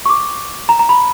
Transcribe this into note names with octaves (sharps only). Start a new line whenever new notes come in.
C#6
D6
A#5
A#5
B5